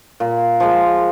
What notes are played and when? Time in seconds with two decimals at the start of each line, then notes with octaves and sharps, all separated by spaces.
0.20 A#2
0.60 F3 G#3